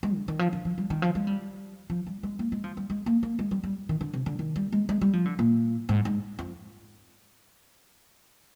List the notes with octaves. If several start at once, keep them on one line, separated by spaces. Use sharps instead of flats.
G#3
D3
D#3
F3
D3
F3
G3
D#3
F3
G#3
G3
F3
G3
G#3
A#3
G#3
F3
G3
G#3
A#3
A#3
G#3
G3
G3
D#3
D3
C3
D3
D#3
G3
G#3
G#3
G3
F3
D3
A#2
G#2
G#2
F2